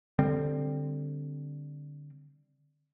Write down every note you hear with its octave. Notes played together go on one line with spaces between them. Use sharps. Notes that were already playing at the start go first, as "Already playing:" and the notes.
D3 G3 C4